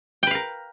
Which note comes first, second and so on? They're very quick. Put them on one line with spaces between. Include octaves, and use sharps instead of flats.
G5 B4 F5 A#4